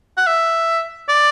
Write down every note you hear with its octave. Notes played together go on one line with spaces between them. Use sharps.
F#5
E5
D5